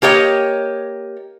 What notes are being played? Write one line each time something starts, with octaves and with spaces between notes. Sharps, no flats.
A#3 G4 C#5 D#5